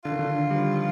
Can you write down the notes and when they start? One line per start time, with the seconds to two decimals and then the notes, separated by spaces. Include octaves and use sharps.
0.04 D3 F4
0.12 D#3
0.19 D3
0.31 D3
0.50 G3
0.55 F3